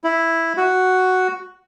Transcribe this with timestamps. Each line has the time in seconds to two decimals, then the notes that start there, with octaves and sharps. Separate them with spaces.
0.04 E4
0.57 F#4